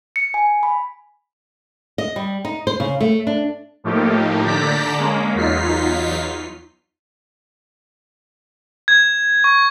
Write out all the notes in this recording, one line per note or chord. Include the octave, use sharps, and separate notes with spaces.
C#7
G#5
B5
D#5
G3
D#4
C5
C#3
A3
D4
A2 F3 A3 A#3 D#4 G4
D3 D5 A5 A#5 G6 B6
G#3 A#3 C#4
E2 F#3 D#4 F4 B6 C7
G#6
C#6